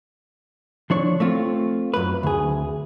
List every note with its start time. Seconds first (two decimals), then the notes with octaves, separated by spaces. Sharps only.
0.90 F3 D4 C#5
1.20 A3 C4 F4
1.94 F#2 B4
2.23 D2 G#4